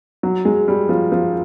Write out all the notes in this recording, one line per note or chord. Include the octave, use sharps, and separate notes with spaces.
F#3
G#3
G3
F3
F3